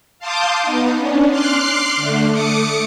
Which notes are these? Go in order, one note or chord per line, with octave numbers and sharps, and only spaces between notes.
F5 A5 C6 D6 D#6 G6
B3 D#4
C#4 D4
C6 D6 F6 F#6 C7
D3 A3
A3 D6 D#6 C#7